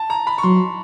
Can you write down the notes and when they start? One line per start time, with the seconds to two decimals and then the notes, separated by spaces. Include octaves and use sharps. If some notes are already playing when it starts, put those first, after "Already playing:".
Already playing: A5
0.10 A#5
0.27 B5
0.38 C#6
0.43 F#3 C6